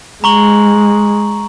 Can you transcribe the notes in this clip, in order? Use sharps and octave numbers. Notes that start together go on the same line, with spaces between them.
G#3 A#5 C#6 F#7